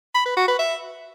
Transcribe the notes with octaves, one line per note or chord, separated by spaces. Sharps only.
B5
B4
F#4
B4
E5